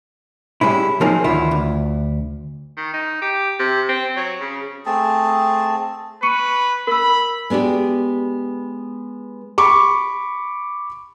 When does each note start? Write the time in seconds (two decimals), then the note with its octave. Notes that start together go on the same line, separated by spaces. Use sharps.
0.61 G3 G#3 C#4 E4
1.01 F3 F#3 A#3 C4 D#4 G#4
1.24 D2 D#3 E3 E4 F4 E5
1.51 D2
2.77 D#3
2.93 D#4
3.22 G4
3.59 C3
3.89 C4
4.17 F#3
4.40 C#3
4.86 A3 C4 G#4 A5
6.23 B4 C#6 C#7 D#7
6.87 A#4 B5 E6
7.50 G#3 B3 D4 F#4 G4
9.58 B5 C#6 D6